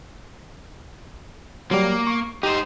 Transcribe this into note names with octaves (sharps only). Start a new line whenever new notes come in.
F#3 G3 A#3
C#6
D#4 G4 C5